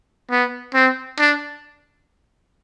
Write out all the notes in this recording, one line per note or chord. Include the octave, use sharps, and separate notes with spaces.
B3
C4
D4